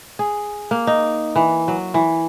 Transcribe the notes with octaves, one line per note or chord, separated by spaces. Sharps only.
G#4
A#3
D#4
E3
F#3
E3